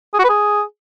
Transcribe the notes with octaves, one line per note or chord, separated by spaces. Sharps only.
G#4
F#4
B4
G#4